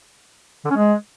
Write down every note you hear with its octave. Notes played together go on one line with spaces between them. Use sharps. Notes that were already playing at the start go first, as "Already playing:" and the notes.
D3
C#4
G#3